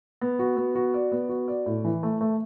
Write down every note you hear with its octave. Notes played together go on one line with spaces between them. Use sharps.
B3
F#4
B3
F#4
D5
B3
F#4
D5
A2
E3
A3
A3